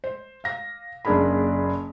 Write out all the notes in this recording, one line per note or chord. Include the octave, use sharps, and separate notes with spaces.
C5
F5 A#6
F#1 A#3 D4 G#4 A#4 B5